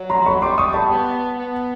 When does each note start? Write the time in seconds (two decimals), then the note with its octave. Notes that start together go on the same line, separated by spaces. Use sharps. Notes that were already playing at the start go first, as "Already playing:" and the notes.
Already playing: F#3
0.10 A#5 C6
0.26 B5 C#6
0.42 G3 C6 D6
0.58 C#6 D#6
0.74 A5 B5
0.90 B3
1.39 B3